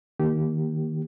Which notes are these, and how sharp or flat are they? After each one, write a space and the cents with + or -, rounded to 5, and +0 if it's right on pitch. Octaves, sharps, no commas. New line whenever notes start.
D#3 +0 A#3 +0 G4 -20